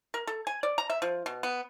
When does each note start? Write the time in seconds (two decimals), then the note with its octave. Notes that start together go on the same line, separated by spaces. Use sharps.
0.14 A#4
0.27 A4
0.47 G#5
0.63 D5
0.78 A#5
0.90 E5
1.02 F3
1.26 B2
1.43 B3